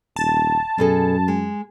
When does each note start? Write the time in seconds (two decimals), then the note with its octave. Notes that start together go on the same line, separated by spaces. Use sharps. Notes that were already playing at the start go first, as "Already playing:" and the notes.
0.16 D#1 A5
0.78 F#2 B2 G#4 A4
1.28 G#3